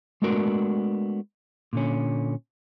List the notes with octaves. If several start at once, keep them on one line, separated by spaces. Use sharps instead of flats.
G#3 A3 B3 D4 F#4 A#4
A#2 D3 C#4